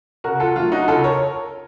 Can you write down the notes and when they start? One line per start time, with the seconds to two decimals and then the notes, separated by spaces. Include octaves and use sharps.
0.24 C#3 F#4 A#4
0.40 F4 A4
0.56 F#3 A3 F4
0.72 D#4 F#4
0.88 C#3 F4 A4
1.04 A#4 C#5